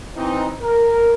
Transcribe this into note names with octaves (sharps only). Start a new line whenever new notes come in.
E3 C4 D#4
A#4